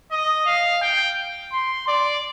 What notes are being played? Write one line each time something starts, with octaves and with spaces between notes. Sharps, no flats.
D#5
F5
G5
C6
D5